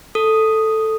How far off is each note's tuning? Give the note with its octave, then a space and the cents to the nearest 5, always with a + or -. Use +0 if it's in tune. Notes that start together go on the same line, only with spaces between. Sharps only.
A4 +0 D#6 +0